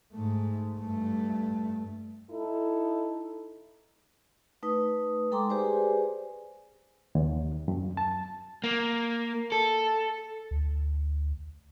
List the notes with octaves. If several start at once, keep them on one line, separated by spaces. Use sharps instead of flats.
G#2 A3
G2 A3
D#4 E4 A4
A3 D#4 B4 D#6
G#3 A4 G5 A#5 C6 D6
G4 G#4 B4 C5 D5 G#5
D#2
F#2
A5
A#3
A4
D2